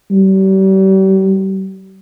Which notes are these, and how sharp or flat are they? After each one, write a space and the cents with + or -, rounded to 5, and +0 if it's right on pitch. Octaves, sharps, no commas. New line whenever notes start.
G3 -40